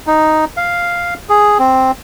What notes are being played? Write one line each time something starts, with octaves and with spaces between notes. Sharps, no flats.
D#4
F5
G#4
C4